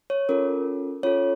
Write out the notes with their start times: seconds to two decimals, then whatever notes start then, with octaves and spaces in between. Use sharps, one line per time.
0.10 C#5
0.29 C#4 F4 A4 A#4
1.03 C#4 F4 A4 C#5